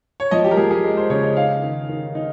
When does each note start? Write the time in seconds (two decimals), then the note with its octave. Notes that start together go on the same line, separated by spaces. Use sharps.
0.20 C#5
0.31 F3 D#5
0.44 G4
0.51 A#4
0.57 F3 G#4
0.71 G#4
0.85 G#3
0.97 C5
1.10 C#3 C#5
1.23 D#5
1.36 D#4 F5
1.63 D#3
1.89 D#3
2.15 D#4